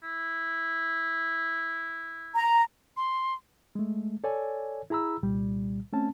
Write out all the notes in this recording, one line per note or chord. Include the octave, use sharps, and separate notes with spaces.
E4
A#5
C6
G#3 A3
A4 C#5 D5 G#5
E4 G#4 A#5 B5 E6
C2 A#2 G3
A3 C4 C#4 A5